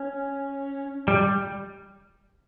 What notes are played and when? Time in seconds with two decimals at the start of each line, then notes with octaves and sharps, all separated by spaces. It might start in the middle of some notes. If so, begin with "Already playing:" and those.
Already playing: C#4
1.08 G3